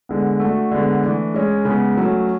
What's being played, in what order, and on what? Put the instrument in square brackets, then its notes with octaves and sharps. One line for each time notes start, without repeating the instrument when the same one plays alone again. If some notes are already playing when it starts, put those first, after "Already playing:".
[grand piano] D3 G#3 B3
A3 D4 F#4
D3 G#3 B3
E3 A3 D4
G#3 C#4 G#4
C#3 G#3 B3
F#3 A3 C#4